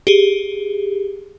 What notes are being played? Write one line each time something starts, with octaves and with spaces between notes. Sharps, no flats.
G4 G#4